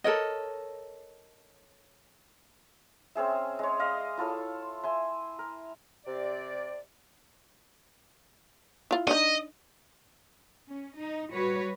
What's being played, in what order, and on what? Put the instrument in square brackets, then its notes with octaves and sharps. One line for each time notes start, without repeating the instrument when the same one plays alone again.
[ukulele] A4 A#4 C#5 D#5
[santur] C4 C#4 G#4 E5
G#3 C#5
D5 D#5 F5
E4 F4 A4 C#5
E5 G#5 C6
A#4
[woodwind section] C3 D5
[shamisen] E4 F4
[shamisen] D4 D#4 [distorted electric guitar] D#5
[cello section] C#4
D#4
G3 F#4 B4 C#5